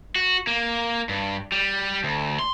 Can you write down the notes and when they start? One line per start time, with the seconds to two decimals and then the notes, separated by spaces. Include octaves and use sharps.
0.16 F#4
0.47 A#3
1.09 G2
1.52 G3
2.04 D2
2.39 C6